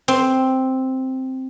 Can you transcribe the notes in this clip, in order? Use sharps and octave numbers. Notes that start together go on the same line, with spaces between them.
C4